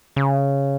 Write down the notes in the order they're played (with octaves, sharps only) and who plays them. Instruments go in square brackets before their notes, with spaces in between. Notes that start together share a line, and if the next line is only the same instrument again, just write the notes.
[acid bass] C#3